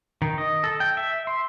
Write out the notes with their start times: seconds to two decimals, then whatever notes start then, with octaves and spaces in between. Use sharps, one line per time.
0.22 D#3
0.38 D#5
0.64 A4
0.80 G5
0.97 E5
1.27 C6